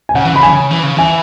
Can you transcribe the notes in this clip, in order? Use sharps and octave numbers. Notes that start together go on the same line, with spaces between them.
G#5
C#3 F#5
E3
C#3 B5
G#5
E3
C#3
E3
C#3
E3 G#5